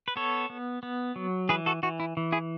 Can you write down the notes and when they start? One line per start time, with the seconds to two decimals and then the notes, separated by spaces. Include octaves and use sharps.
0.08 B4
0.16 B3 A4 C#5
0.50 B3
0.83 B3
1.16 F#3
1.49 E3 G#4 B4
1.66 F#4 A4
1.83 E3 F#4
2.00 E4
2.17 E3
2.32 E4 G#4